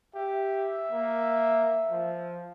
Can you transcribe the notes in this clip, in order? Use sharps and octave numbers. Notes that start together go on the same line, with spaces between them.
G4 E5
A#3
F3